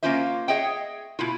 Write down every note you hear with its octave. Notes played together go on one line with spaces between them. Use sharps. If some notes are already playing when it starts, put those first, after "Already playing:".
A#3 C4 C#4 F4 C5 E5
G#4 C#5 D#5 E5 F#5 G5
B2 E4 F4